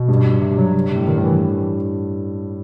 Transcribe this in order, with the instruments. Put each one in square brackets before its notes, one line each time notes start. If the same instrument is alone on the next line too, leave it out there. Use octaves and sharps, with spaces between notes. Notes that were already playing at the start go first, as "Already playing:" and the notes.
Already playing: [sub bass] B2
[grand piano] G2
[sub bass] C3
F#3
[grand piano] A2 [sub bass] C3
[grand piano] G2 [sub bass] D#3
[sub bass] E3